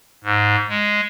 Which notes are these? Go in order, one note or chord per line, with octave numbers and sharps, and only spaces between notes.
G#2
G#3